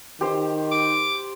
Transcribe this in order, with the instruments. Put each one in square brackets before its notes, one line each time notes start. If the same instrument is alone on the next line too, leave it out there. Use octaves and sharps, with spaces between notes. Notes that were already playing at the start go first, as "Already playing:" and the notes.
[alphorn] D#3 [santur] G4 C5
[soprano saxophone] D6